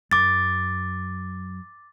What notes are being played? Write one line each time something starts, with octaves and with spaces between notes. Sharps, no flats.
F#2 D6 A6